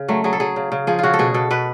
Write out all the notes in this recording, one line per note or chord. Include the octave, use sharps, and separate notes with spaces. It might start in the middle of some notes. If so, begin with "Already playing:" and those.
Already playing: C#3
F#3 A3
F#3 G#4
A4
F#3 G#4
C#3
C#3
F3 G#4
C#3 F4 F#4
A4
B2 G#4
B2 A4
B2 B4